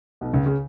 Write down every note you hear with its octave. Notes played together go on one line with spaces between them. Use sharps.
B1 B2
C#2 C#3
C#3